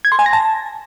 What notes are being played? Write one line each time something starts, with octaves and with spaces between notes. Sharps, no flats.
G#6
C6
G#5
A#6
A5